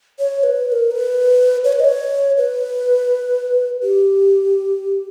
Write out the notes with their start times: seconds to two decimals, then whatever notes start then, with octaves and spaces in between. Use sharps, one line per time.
0.19 C#5
0.43 B4
0.68 B4
0.72 A#4
0.91 B4
1.64 C#5
1.72 B4
1.80 D#5
1.84 C#5
2.37 B4
3.82 G4